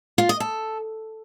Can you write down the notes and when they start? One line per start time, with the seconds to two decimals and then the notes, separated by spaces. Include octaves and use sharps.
0.18 F4
0.29 D#5
0.40 A4